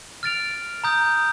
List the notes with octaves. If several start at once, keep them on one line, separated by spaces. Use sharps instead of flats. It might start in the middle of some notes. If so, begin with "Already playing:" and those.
F6 A6 D7 F7
A#5 D#6 G6